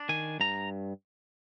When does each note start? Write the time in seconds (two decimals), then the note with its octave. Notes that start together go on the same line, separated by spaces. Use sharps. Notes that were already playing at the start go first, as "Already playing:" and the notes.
Already playing: D4
0.09 D#3 G#5
0.40 G2 A#5